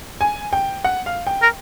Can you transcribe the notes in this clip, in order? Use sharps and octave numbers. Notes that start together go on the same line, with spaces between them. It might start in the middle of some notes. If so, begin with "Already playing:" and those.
G#5
G5
F#5
F5
G5
A#4